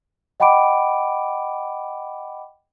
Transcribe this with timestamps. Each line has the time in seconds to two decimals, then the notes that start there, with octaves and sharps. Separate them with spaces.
0.40 D#5 F#5 G5 B5 D6 D7